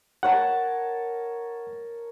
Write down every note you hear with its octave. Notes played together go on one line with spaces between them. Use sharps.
A#4 C#5 F#5 A5